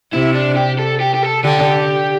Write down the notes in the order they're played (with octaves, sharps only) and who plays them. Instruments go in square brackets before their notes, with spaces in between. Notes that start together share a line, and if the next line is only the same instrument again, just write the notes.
[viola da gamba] C3 [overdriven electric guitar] E4
[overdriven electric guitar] D4
G4
A4
G4
G4
A4
[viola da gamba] D3 [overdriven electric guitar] G4